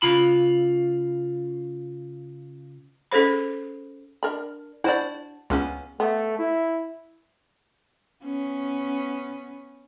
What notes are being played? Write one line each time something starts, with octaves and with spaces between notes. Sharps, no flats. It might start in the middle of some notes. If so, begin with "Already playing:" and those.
C#3 F4 B5
C#4 G#4 A4 C5 B5
D4 A#4 B5
D4 E4 F#4 C5 D5
C#2 C#3 B3 C#4
A3 B3
E4
B3 C#4